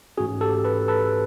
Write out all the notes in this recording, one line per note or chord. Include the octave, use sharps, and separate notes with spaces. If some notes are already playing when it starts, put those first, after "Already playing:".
G#2 E3 A3 C#4 F#4 G#4
G4 A4
A4 B4
A4 B4